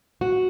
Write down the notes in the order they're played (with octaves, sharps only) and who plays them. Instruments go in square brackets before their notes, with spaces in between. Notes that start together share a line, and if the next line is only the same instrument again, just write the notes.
[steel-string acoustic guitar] F#4